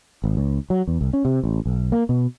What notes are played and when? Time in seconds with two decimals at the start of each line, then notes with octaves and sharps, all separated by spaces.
0.24 G#1
0.37 C#2
0.70 F#3
0.87 E2
1.01 C2
1.13 C#4
1.25 C3
1.44 A1
1.66 B1
1.92 A#3
2.09 B2